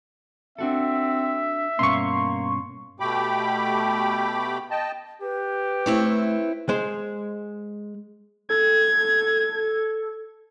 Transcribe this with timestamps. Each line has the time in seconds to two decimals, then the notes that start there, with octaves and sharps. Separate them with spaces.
0.59 C4 D4 F#4 A4 E5
1.79 G2 B2 A#3 C#4 C6 C#6
3.00 B2 A3 G4 G5 B5 D6
4.70 D#5 G5 A5
5.22 G4 B4
5.86 A3 C4 E4 C#5
6.69 G#3 G#4 C5
8.50 A4 G#6